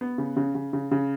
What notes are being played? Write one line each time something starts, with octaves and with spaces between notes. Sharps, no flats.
B3
C#3
C#3
C#3
C#3
C#3